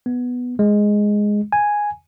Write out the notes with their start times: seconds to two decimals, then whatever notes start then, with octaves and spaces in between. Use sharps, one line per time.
0.06 B3
0.59 G#3
1.52 G#5